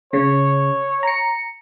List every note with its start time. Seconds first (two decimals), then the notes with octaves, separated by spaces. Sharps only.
0.13 C#3 C#5
1.03 A#5 C#7